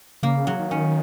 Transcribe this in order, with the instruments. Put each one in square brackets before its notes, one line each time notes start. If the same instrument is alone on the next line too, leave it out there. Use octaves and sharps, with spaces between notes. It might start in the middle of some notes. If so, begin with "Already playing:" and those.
[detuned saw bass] C#3 [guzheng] A#3
[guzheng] F#3
[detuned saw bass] D#3
[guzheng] C#4